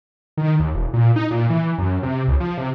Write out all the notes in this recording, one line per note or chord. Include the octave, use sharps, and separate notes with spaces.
D#3
D#2
E1
A#2
D#4
A#2
E3
F#2
C3
C#2
F3
C3